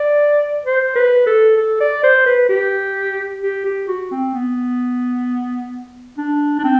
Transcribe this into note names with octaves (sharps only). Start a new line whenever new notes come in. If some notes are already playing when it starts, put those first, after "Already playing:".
Already playing: D5
C5
B4
A4
A4
D5
C5
B4
G4
G4
G4
F#4
C4
B3
D4
D4
C4